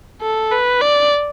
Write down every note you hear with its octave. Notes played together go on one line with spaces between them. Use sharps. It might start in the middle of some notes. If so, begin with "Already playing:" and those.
A4
B4
D5